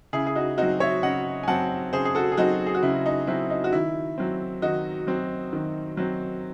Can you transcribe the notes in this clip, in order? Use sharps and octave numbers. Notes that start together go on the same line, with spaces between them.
C#3 E4 G#4
G#4
D#4 F#4
F#3 C4 D#4 F#4
C#5 E5
C#3 D#5 F#5
G#5
F#3 C4 F#5 A5
C#3 G#4 C5
G#4
F#4 A4
G#4
F#3 C4 D#4 F#4
G#4
F#4
C#3 E4
D#4
F#3 C4 E4
D#4
F#4
D#3 E4
F#3 C4
D#3 D#4 F#4
F#3 C4
D#3
F#3 C4